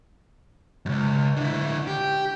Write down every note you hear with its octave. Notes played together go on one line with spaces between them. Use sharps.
C#2 F#2
D3 E4
G4